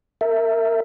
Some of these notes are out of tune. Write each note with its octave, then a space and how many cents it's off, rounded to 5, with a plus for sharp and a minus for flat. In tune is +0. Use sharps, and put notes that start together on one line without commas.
A#4 -25 E5 +0